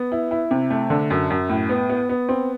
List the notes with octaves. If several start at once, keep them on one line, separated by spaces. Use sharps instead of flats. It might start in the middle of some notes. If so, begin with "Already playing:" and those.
Already playing: B3
E4
E4
C3
A3
D3
F#2
F#2
A2
B3
B3
B3
C4